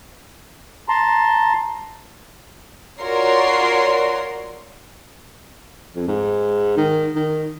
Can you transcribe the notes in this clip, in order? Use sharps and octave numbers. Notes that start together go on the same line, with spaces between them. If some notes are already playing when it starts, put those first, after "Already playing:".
A5 A#5 C6
F4 F#4 A#4 C#5 D5 C6
F2
G#2
D#3
D#3